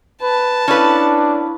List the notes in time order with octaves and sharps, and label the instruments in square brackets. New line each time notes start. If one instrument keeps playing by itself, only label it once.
[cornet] B4 [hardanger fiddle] A5
[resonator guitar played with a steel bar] C#4 B4 [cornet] D4 [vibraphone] E4 F5 B5